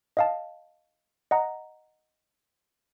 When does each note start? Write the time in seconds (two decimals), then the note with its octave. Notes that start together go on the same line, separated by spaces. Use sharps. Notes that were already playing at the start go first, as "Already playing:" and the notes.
0.17 D#5 F5 A5
1.31 D#5 F#5 A#5